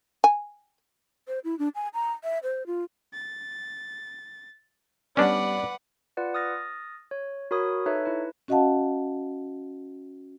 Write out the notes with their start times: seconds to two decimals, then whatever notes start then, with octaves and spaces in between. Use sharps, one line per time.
0.24 G#5
1.28 C5
1.44 E4
1.59 D4
1.75 G#5
1.94 A#5
2.24 E5
2.43 C5
2.67 F4
3.14 A6
5.17 G3 B3 C#4 D4 B4 D5 F#5
6.17 F4 B4 D5 F#5
6.34 D#6 F6 A6 A#6
7.11 C#5
7.51 F#4 A#4 C#5 B5 D#6
7.86 D#4 A4 B4 C#5 E5
8.05 E4 B4
8.48 C#4 F#4 D#5 F5 F#5 A5